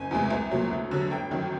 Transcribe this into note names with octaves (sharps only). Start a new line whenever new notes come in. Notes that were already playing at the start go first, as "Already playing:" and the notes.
Already playing: F#1 G#5
E2 C3 E3 G#3
C2
A#2 F#3
D2
D3 F#3
G1 G5
F#2 D#3 F#3